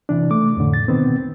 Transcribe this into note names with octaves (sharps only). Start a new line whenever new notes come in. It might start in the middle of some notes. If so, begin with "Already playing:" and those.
C3 E3 D4
A3 D6
F2 A2 D3
A6
B2 D#3 B3 C4